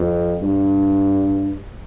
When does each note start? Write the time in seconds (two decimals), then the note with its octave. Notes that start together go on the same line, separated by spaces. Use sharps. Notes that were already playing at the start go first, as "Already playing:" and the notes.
Already playing: F2
0.42 G2